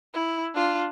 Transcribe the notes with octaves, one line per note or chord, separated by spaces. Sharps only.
E4
D4 F4